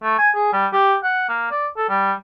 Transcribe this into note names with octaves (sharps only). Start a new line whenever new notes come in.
A3
G#5
G#4
G3
G4
F#5
A#3
D5
A4
G3